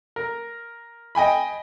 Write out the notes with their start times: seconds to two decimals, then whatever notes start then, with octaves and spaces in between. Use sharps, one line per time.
0.16 A#4
1.15 D#5 G5 G#5 B5